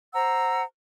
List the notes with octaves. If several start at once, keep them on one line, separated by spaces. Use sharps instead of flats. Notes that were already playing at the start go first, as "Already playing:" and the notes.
C5 F#5 A#5 E6